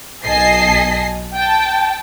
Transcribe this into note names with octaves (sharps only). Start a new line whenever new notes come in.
B1 D#5 G#5 A5 C7
G5 A5